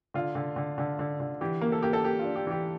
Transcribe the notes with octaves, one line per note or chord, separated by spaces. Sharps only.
D3 F4
D3
D3
D3
D3
D3
E3 G4
A#3
A4
A#3 G4
A4
A#3 G4
F4
D4
G4
E3 G4